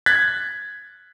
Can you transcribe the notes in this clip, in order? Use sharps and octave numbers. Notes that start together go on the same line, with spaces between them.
F#6 G#6 A6 B6